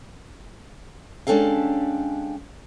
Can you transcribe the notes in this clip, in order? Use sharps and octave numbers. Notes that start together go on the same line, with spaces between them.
G#3 C#4 D4 G4 A4 F5